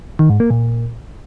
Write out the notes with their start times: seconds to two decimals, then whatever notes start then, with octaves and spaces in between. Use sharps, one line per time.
0.19 D#3
0.30 G#2
0.40 A#3
0.50 A#2